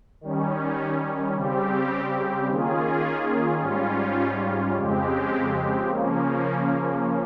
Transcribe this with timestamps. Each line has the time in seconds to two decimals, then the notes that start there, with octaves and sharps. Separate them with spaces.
0.21 D#3 G3 C#4
1.35 C#3 G3 C4 G4
2.48 D#3 A#3 C#4 F4 G#4
3.62 G#2 G3 C#4 F4
4.75 F2 C#3 G#3 C4 G4
5.88 C#3 F3 A#3 C#4